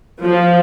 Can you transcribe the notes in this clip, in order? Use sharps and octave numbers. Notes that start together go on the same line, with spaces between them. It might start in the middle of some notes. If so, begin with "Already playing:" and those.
F3